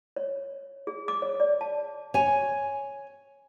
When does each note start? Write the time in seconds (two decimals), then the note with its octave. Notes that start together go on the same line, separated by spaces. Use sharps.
0.16 C#5
0.87 G#4
1.08 D6
1.22 C#5
1.40 D5
1.61 A5
2.14 C#5 G#5